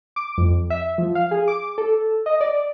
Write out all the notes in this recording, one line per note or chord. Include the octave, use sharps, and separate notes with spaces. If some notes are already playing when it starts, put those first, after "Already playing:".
D6
F2
E5
F3
F5
G#4
D6
A4
D#5
D5